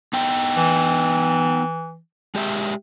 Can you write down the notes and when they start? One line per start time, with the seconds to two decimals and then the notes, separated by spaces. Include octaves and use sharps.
0.13 B3 D#4 G5
0.57 E3
2.35 G#3 G4 E5